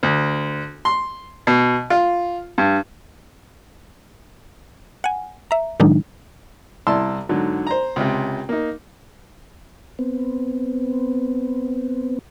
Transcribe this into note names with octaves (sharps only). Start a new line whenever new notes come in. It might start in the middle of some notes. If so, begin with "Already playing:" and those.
D2
C6
B2
F4
G2
F#5 G#5
E5 A#5
A2 D#3 F#3 G#3 D4 D#4
C2 E4 A5 C6 E6
G#2 D3 F#3
C5 A#5
C#2 C3
A#3 D#4
B3 C4